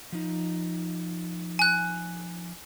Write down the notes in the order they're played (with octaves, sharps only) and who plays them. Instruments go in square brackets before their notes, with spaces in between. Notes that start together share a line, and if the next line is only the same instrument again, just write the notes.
[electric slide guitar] F3 D#4
[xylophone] G#5 F#6